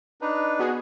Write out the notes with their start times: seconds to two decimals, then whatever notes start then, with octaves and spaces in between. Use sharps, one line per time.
0.21 D4 D#4 B4
0.59 B3 F#4 G#4